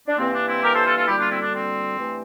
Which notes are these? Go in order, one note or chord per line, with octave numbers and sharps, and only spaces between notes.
D4
G2 E3 A#3 C4
D4
C4 E4
G4 A#4
A4 C5
F4 A4
F4 A4
D2 D3 G3 A#3 E4 G4
D4 F4
C4 E4
D4
C4
G2 E3 A3